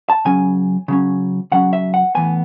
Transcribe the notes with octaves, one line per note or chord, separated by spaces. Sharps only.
A5
C#3 F#3 C#4 G#5
C#3 F#3 C#4
C#3 F#3 C#4 F#5
E5
F#5
A2 E3 B3 G#5